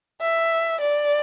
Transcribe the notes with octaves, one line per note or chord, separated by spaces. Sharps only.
E5
D5